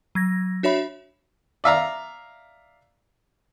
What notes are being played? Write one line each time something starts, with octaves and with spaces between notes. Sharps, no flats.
F#3 G#6 A#6
D4 F#4 C#5 E5 B5
D5 E5 F5 A#5